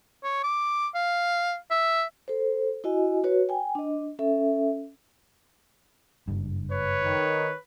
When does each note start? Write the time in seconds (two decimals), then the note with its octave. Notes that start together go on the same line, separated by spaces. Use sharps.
0.23 C#5
0.44 D6
0.95 F5
1.71 E5
2.28 A4 C5
2.84 E4 F#4 D#5 G#5
3.24 F#4 B4 C#5
3.49 G5 G#5
3.75 D4 D#5
4.19 C#4 A4 E5
6.28 F#1 G2
6.72 B4 C#5
7.03 D#3